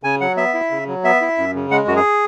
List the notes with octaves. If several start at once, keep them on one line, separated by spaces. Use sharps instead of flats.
C#3 G#5
F#3 F#5
B3 E5
E4
C#3
F#3
B3 E5
E4
F#2
C#3
G#3 F#5
F#2 F#4
G#4